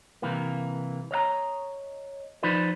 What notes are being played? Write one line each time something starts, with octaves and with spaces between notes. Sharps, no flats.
C2 C3 E3 A#3
C#5 D#5 F5 A#5
F3 D#4 F4 B4 C5 D5